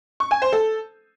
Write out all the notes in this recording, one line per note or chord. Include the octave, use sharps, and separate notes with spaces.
C#6
G#5
C5
A4